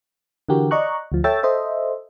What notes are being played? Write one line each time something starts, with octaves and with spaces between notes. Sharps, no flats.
D3 E3 F#4 G4 A#4
D5 D#5 A#5 C#6 F#6
D2 F3
A4 C#5 E5 G5 E6 A6
A4 C5 D#5 E5